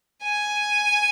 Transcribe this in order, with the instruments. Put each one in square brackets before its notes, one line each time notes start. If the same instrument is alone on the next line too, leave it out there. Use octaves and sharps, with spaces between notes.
[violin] G#5